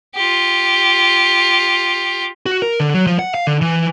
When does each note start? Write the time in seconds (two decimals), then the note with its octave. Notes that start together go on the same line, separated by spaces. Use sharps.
0.16 F4 G4
2.46 F#4
2.62 A#4
2.80 D3
2.94 F#3
3.07 F3
3.19 F#5
3.34 F5
3.47 D3
3.62 E3